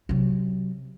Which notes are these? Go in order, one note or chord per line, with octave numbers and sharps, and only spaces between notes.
C3 F#3